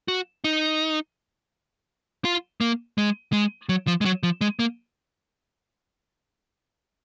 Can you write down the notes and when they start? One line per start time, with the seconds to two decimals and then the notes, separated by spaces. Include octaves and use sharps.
0.08 F#4
0.44 D#4
2.25 F4
2.61 A#3
2.98 G#3
3.33 G#3
3.69 F#3
3.87 F3
4.01 G#3
4.05 F#3
4.23 F3
4.41 G#3
4.59 A#3